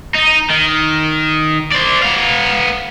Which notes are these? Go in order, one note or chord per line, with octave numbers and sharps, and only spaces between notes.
D#4
D#3
C5 D5
B3 F5